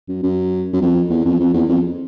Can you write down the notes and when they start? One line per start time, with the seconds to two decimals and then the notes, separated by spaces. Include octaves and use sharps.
0.08 F#2
0.23 F#2
0.73 F#2
0.81 F2
1.10 E2
1.25 F2
1.40 F2
1.54 E2
1.69 F2